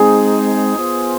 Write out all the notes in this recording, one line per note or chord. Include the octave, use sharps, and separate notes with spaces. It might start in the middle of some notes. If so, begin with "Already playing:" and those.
Already playing: G#3 C4 D#4 G#4
B3 F4 C5